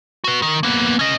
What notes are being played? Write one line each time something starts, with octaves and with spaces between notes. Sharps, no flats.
F#4 B4
D#3
A#3 B3
C#4 D#5